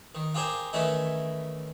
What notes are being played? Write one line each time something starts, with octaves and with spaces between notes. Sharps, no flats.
D#3
F4 G4 G#4 A#4 C5
D#3 E3 A3 C#4 E4 D#5